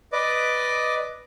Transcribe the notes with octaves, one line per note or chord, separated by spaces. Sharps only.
B4 D5 D#5 D6